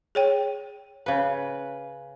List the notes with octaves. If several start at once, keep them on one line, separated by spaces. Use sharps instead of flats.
G#4 C#5 G5
C#3 B4